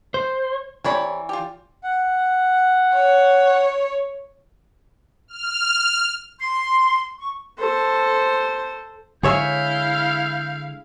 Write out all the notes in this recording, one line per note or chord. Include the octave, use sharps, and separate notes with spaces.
C5
C3 E3 C#5 D5 B5
F4 G4
F#5
C#5
F6
C6
C#6
A4 C5
D3 G#3 E4 G#4 C#5 E5 F5 G6